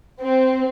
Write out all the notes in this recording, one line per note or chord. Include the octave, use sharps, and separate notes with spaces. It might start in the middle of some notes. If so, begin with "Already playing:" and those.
C4